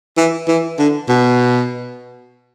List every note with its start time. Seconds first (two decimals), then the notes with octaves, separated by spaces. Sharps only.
0.17 E3
0.48 E3
0.78 D3
1.09 B2